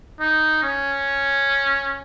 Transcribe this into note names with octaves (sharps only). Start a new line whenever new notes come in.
D#4
C#4